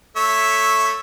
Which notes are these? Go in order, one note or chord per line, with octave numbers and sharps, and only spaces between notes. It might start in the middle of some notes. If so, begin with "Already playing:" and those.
A3 C#5 E5